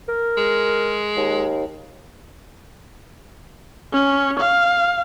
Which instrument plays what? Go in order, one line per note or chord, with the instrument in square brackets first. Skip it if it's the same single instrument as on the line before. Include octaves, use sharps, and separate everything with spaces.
[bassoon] A#4
[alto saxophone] G#3
[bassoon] D#2
[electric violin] C#4
F5